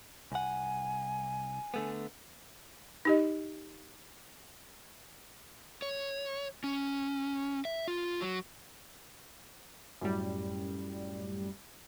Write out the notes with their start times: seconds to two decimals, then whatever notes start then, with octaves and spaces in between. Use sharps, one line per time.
0.32 C2 F#5 G#5
1.74 D3 A3 B3
3.05 D#4 G4 D#5
5.82 C#5
6.64 C#4
7.65 E5
7.88 F4
8.21 F#3
10.01 F#2 A2 G3